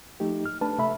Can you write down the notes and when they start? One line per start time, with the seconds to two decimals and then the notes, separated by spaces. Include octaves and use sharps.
0.20 F3 A3 D#4 G4
0.46 F6
0.61 A3 D4 B4 A5
0.78 C3 A3 E5 B5